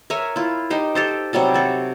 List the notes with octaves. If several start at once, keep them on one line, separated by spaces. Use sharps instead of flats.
A#4 C#5 E5 G#5
E4 F4
D#4 G4 C5
G4 A4 C5
C3 F#3 G3 A4
F#4 A4